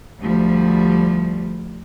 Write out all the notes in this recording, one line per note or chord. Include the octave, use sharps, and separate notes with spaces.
D2 F3 G3